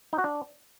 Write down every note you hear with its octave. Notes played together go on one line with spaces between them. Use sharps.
D#4
F#4
D4